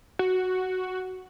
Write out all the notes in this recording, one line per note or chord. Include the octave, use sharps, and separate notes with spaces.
F#4